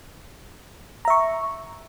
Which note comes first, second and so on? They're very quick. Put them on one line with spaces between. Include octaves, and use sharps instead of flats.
A#5 E5 C#6